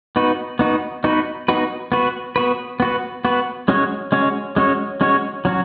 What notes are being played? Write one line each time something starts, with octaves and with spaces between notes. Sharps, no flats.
B3 D#4 F#4 B4
B3 D#4 F#4 B4
B3 D#4 F#4 B4
B3 D#4 F#4 B4
B3 F#4 B4
B3 F#4 B4
B3 F#4 B4
B3 F#4 B4
G#3 C#4 F#4 C#5
G#3 C#4 F#4 C#5
G#3 C#4 F#4 C#5
G#3 C#4 F#4 C#5
F#3 C#4 F#4